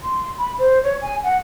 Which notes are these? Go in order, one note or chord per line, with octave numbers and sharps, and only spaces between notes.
C6
B5
C5
C#5
G#5
F#5